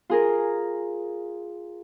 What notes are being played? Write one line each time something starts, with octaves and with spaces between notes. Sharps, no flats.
F4 G#4 A#4